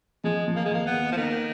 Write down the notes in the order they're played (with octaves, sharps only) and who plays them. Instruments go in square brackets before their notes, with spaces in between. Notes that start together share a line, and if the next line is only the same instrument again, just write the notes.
[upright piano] F3 [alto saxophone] G#3
[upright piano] F3
[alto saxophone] A#3
G#3
[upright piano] D#2 [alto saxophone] A#3
[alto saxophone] B3
[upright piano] D#2
[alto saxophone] F3
[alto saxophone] D#3 [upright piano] A#3